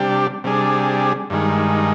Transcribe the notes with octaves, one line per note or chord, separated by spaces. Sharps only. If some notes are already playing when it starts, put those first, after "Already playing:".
Already playing: C3 G3 D4 G4
C3 G3 D4 G#4
G2 D#3 G#3